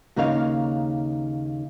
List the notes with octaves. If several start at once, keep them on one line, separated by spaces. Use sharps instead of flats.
D#2 C#3 D#4 A#4 C#5 F5